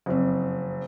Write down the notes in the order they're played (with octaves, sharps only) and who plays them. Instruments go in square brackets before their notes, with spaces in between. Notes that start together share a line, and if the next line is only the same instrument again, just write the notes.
[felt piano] F#1 F2